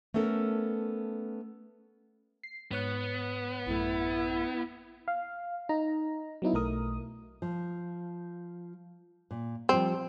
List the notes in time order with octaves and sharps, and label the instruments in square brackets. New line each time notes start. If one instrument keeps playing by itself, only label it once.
[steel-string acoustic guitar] A3 B3 C#4 A4 A#4
[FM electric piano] C7
[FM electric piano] G#2 C#5 F#6 [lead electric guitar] B3
[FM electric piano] A1 F#2 A3 [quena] E4
[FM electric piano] F5
D#4 A#5
F#3 B3 D#4 E4
B1 A3 A#4 D#6
[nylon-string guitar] F3
A#2
[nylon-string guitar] F3 G3 [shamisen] C4